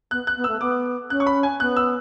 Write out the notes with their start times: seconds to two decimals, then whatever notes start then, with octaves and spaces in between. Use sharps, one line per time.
0.11 B3 F#6
0.27 F#6
0.36 B3
0.44 A3 E6
0.60 B3 D6
1.10 C#4 F#6
1.20 C#6
1.27 B5
1.43 G#5
1.60 B3 F#6
1.76 E6